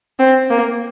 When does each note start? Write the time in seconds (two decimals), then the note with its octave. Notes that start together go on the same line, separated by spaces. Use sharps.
0.19 C4
0.50 A#3